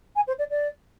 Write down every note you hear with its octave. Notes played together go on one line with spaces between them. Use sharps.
G#5
C5
D5
D5